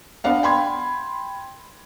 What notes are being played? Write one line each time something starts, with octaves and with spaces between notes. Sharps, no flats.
B3 D4 F5 F#5
G5 B5 C6 G#6